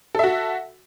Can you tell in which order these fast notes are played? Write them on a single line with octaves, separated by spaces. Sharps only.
A4 E5 F#4